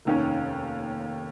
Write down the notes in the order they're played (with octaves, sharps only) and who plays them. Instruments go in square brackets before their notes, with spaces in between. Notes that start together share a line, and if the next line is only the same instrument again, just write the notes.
[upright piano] F1 D#2 D#3 C#4